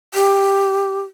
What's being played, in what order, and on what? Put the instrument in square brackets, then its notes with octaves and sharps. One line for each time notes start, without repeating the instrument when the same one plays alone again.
[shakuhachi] G4